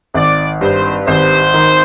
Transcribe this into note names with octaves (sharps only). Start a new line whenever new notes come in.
G#1 D5
G2 C5
G#1 C5
D#3